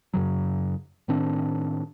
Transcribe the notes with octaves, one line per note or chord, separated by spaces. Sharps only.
F#2 C#3 F#3
A2 D#3 C4 D4